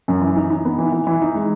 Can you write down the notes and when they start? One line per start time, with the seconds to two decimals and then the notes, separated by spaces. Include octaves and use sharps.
0.08 F#2
0.21 E3
0.36 D#4
0.50 D#4
0.65 B3
0.78 E3
0.92 E3
1.07 E3
1.22 D#4
1.35 G#3